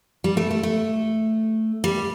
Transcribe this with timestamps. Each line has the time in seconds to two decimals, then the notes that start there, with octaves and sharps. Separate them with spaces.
0.24 G3
0.37 A3
0.51 A3
0.63 A3
1.84 G3